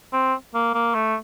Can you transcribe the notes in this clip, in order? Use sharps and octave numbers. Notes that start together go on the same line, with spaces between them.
C4
A#3
A#3
A3